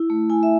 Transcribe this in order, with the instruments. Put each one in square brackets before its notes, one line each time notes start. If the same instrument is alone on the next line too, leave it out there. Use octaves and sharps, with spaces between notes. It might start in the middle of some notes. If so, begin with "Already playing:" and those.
Already playing: [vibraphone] E4
A3
E4 G#5
E5